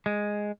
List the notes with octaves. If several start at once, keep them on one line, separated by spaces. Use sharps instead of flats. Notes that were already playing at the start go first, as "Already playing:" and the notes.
G#3